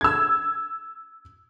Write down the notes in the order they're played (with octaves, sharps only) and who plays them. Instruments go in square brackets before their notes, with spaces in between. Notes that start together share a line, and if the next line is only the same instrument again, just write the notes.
[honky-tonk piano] E6 G#6